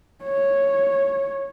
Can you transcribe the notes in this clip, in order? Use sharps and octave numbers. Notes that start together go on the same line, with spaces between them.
C#5